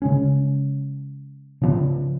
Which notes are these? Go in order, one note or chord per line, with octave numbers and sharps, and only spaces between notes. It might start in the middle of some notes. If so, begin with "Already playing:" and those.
C#3 G#3 C#4
C#3 F3 B3